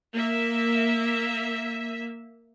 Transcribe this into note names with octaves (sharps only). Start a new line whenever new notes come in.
A#3 E5